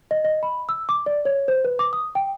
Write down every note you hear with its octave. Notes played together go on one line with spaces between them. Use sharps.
D#5
D#5
B5
E6
D6
D5
C#5
C5
B4
D6
D#6
G5